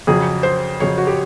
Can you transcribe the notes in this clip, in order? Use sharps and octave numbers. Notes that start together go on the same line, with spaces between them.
F2 C#3 F#3 G#4
C5
F2 C#3 F#3 C#5
F#4
G4